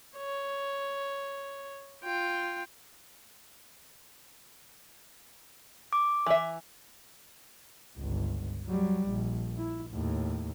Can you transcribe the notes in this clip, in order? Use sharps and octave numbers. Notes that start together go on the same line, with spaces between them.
C#5
F4 G5
D6
E3 E5
G1 C#2
F#3 G3
A#1
E4
D#2 A2